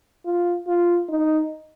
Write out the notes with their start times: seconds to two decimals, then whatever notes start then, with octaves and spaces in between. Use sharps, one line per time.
0.25 F4
0.67 F4
1.09 D#4